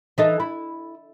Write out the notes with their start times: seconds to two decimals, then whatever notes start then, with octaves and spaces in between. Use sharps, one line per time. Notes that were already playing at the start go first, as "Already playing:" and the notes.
0.18 E3 D#4 A4
0.40 E4